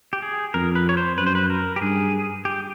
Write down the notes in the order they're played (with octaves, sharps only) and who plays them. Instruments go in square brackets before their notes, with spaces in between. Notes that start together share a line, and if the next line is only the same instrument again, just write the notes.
[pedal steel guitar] G4
G#4
[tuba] F2 [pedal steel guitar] A#4
[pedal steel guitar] B4
C#5
C5
[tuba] F#2 [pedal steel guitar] B4
[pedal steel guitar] C5
B4
A#4
G4
[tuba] G2 [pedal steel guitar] G#4
[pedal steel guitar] G4